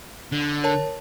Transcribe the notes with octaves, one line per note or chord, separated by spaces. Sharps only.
D3
A#4 C#5 A5